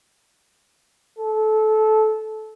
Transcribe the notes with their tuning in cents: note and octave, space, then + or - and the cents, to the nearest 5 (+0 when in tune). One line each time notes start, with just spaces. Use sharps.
A4 -20